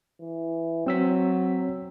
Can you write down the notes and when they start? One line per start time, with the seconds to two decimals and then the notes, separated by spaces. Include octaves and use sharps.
0.21 E3
0.86 F#3 C4 E6 B6